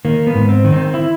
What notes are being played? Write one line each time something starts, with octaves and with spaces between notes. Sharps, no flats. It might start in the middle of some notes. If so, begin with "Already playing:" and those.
D#3 A#3
B3
G#2
C4
D#3
C4
E4